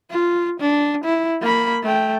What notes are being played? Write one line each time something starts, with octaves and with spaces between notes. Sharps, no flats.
F4
D4
E4
A#3 B5
A3 G5